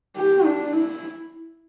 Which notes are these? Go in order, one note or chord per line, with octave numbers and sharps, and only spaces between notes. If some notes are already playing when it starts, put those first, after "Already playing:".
G4
D4
E4